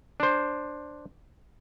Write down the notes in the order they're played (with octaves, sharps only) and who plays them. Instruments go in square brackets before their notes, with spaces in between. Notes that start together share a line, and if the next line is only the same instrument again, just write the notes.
[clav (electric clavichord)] D4 C5